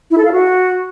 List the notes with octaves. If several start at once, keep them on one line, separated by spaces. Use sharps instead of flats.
E4
A4
F5
F#4